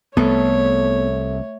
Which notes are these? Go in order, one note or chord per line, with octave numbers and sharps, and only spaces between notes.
C2 A3 B3 C#5